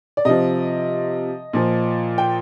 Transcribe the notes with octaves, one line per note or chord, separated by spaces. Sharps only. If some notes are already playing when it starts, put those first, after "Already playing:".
D5
C3 F3 D#5
A#2 F3
G5